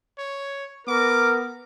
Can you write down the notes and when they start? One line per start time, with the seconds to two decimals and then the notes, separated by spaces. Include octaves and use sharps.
0.18 C#5
0.87 B3 A#4 D6